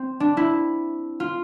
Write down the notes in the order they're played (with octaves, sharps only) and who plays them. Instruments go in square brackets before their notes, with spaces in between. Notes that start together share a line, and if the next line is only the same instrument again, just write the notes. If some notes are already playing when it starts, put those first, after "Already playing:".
Already playing: [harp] C4
D4
E4
F4